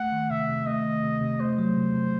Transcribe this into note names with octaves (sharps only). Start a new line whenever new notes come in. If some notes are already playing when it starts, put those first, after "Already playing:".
Already playing: A3 F#5
D#3
C3 E5
C3
A3 D#5
D#3
C3
C3
A3 C5
F#3
C3
C3